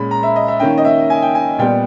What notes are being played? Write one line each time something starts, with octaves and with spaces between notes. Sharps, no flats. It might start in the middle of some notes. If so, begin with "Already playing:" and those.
Already playing: A#2 G#3 C#4 B5
A#5
E5
D#5
E5
D#3 A#3 C#4 G5
D#5
E5
G#5
G5
G#5
A#2 G3 B3 G5